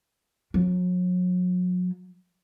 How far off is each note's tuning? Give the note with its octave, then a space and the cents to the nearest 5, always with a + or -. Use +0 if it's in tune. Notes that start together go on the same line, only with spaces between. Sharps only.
F#3 -40